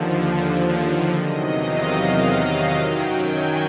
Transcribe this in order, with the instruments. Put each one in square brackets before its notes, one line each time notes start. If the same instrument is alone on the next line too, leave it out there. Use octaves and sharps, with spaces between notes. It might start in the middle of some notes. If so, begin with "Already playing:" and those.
Already playing: [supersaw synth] D#2 D3 F3
E2 C3 D#3 F#3 D#5
F5
F5
F#2 D#3 F#3 G5
G#5